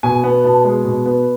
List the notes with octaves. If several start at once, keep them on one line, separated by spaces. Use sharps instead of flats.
B2 G#5
B3
B2 A5
G#3
B2
B3